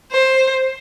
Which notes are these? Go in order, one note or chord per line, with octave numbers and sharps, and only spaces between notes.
C5